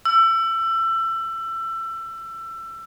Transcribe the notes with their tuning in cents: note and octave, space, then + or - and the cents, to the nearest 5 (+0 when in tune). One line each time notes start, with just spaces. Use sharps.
E6 +25